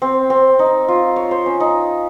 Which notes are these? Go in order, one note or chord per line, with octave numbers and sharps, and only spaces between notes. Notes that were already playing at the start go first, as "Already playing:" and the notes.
C4
C4
D#4
F4
C#5
C5
C#4
D#4